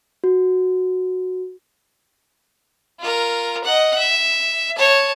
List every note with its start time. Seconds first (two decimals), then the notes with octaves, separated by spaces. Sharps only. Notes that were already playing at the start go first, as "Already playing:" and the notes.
0.24 F#4
2.99 F4 A#4
3.64 D#5 F#5
3.97 E5
4.77 C#5 A5